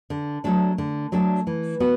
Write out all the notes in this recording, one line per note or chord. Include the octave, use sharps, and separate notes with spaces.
D3
F#3 A3 D4 A4
D3
F#3 A3 D4 A4
E3
B3 F#4